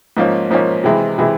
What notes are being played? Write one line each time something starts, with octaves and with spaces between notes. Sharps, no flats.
G#2 F3 A#3 C#4
G#2 F3 A#3 C#4
C3 E3 G#3 E4
C3 E3 G#3 E4